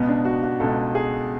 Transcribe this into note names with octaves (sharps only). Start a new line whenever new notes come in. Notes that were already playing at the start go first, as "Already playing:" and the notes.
Already playing: C#2 B2 B3
D4
F#4
F#4
C#2 B2 A4
G#4